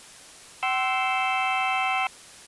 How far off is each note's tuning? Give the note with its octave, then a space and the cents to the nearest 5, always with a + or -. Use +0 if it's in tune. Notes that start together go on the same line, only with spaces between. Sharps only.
G5 -45 C6 +0 E6 +0